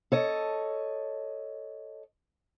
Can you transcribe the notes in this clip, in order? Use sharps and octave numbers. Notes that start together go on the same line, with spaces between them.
A4 C#5 D#5